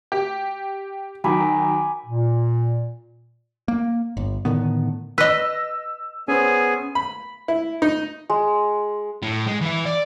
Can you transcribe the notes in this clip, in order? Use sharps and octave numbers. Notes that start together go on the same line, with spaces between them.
G4
D#3 F#3 G#5 B5 D6
A#2
A#3
G1
A2 D3 D#3 B3
B4 D#5 E6
B3 C#4 G#4 C5 G#5
B5
E4
D#4
G#3
A2
G#3
E3 E4
D5